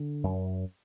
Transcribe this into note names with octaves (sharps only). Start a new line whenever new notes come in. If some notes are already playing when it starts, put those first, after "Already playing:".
Already playing: D3
F#2